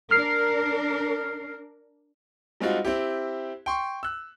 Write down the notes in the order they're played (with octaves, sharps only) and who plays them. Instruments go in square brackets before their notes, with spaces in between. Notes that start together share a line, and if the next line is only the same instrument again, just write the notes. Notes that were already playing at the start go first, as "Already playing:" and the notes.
[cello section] D4 A#4 [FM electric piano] F6 C7
[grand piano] G3 G#3 C4 D#4 F4 F#4
C4 E4 G4
G5 C6 C#6
E6 F#6